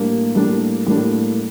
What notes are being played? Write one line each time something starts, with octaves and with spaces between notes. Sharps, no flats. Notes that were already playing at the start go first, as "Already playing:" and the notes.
Already playing: A2 G3 A#3 D4
A2 G3 A#3 D4
A2 G3 A#3 D4